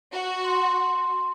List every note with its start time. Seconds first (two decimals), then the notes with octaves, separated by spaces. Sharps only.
0.13 F#4
0.44 C6